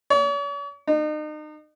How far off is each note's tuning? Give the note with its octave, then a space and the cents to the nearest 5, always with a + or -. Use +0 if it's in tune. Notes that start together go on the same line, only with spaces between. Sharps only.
C#5 +45
D#4 -35